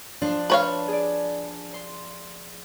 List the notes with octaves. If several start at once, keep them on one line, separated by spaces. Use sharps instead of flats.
F3 D4 C5
B4 C#5 F5
G#4 D5
C6